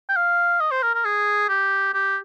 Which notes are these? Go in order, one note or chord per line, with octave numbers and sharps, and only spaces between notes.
G5
F5
D#5
C5
A#4
A#4
G#4
G4
G4